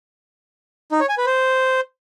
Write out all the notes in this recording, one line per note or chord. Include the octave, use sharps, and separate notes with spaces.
D#4
C#5
G#5
B4
C5